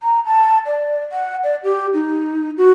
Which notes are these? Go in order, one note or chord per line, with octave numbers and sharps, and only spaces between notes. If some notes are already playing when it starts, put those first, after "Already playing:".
A#5
A5
D5
F#5
D5
G4
D#4
F#4